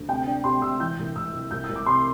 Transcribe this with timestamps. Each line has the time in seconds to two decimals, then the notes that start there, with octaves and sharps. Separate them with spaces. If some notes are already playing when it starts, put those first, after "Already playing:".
Already playing: D2
0.08 C3 G5
0.27 D4
0.44 C3 C6
0.62 C3 E6
0.80 E3 G6
0.99 C2
1.16 C2 E6
1.34 C2
1.51 C2 G6
1.64 E6
1.69 C2
1.76 D6
1.86 C3 C6